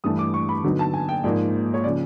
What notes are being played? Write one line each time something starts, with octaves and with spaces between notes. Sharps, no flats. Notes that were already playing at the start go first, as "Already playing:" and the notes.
G2 E3 A3 D#6
D6
C#6
B5
D3 F#3 B3 D#4
A5
G#5
G5
G#2 F3 A#3 D#4 D5
C#5
C#3 F3 D5